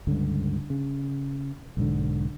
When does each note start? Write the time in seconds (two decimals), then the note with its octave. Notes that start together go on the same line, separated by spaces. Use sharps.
0.07 C#2 G2 D3
0.70 C#3
1.77 B1 G#2 D3